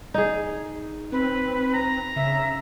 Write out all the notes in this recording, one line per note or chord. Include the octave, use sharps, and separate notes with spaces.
D#4 G#4
C4 B4
A#5
C#3 E5